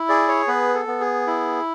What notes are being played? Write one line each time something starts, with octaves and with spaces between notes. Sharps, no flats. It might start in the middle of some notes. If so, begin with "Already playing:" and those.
Already playing: E4
G#4 D5
C#5
B3 B4
A4
B3
G#4
E4